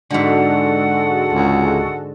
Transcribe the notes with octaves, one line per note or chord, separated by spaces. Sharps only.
G#2 D3 G#3 F#4 A4 F#5
C#2